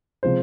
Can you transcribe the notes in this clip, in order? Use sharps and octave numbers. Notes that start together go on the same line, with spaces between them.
C3 F3 G#3 C5